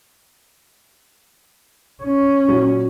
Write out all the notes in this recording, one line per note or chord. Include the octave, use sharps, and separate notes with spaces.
C#4
A#2 F#3